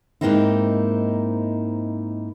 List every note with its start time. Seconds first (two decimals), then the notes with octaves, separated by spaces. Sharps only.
0.21 G#2 B2 A#3 C4 D#4 E4